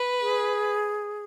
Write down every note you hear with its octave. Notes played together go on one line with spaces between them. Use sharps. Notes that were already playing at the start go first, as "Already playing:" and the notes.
Already playing: B4
G#4